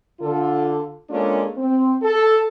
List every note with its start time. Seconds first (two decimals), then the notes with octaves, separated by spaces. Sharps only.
0.20 D3 F4 A4
1.10 G#3 A#3 C#4 D4 F4 A4
1.57 C4
2.03 A4